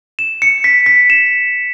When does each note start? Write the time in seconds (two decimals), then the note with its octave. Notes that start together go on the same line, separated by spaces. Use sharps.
0.19 E7
0.42 C#7
0.64 B6
0.86 B6
1.10 E7